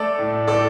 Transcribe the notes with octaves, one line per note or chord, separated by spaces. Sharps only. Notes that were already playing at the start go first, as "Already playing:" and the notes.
Already playing: A3 A4 D5
A2
A2 A4 D5